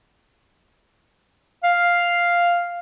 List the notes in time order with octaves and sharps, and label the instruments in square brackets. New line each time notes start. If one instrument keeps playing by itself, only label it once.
[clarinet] F5